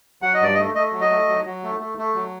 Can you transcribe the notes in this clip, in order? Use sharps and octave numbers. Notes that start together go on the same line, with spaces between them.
F#3 F#5
D#5
G2 D5
D#5
A3
A3 D#5
F#3
D#5
A3
F#3
F#3
A3
A3
A3
F#3